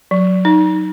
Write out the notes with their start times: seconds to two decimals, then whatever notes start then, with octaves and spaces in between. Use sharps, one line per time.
0.11 F#3
0.45 D#4